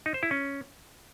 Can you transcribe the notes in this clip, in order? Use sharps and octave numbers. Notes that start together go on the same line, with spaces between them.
D#4
C5
E4
C#4